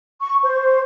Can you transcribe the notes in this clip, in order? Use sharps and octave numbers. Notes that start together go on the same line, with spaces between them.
C#6
C5